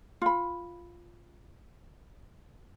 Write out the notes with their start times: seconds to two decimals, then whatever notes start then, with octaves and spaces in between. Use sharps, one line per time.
0.22 F4 B5